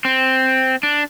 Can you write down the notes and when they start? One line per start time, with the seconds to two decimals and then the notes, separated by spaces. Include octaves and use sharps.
0.05 C4
0.83 D4